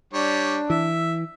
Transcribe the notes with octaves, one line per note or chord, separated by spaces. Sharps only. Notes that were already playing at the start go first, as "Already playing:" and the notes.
G3 D4 C#5
E3 E5